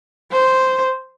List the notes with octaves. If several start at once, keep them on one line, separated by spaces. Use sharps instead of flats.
C5